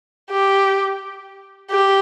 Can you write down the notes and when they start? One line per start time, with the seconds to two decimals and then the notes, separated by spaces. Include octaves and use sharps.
0.31 G4
1.71 G4